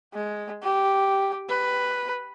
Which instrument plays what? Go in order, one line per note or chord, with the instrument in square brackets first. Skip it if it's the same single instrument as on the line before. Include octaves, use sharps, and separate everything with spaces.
[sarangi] G#3
G4
B4